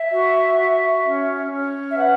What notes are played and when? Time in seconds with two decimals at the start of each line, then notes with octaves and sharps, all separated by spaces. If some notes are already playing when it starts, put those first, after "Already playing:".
Already playing: E5
0.11 F#4
0.57 F#4
1.04 C#4
1.51 C#4
1.90 E5
1.97 B4 F#5